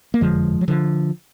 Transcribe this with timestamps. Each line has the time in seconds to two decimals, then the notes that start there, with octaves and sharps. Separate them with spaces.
0.14 A#3
0.21 F#1 F2 D3 F3 G#3
0.61 F#3
0.68 D3 F3